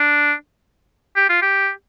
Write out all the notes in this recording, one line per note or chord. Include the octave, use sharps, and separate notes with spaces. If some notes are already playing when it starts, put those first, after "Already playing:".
Already playing: D4
G4
F4
G4